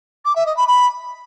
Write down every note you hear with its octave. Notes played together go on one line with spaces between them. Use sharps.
D6
E5
D#5
B5
B5